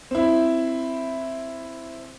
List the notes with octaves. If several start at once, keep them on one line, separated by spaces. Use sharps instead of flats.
C4 E4